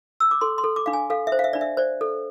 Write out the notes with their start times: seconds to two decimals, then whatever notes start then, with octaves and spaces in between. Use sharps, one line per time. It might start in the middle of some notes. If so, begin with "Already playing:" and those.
0.20 E6
0.31 D6
0.41 A4 C6
0.58 C6
0.64 A4
0.76 D6
0.86 D4 F5
0.93 G#5
1.10 A4 F5
1.27 E5
1.32 C5
1.39 F5
1.44 E5
1.53 D4 D5
1.61 E5
1.77 C5 D5
2.01 A4